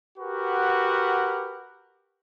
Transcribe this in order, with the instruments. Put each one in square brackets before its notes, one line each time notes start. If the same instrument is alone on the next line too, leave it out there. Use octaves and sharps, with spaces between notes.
[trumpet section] F#4 G4 A#4 B4 F#5